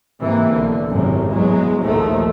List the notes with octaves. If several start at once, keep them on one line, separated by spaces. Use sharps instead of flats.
G#2 C3 E3 A#3
B1 D3
G#1 F#2 A2 C3
E2 F#3 G#3
A#1 D#2 A2 D#3 F3 A3